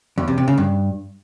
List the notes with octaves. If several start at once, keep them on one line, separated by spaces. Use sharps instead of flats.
E2
C3
C3
C#3
G2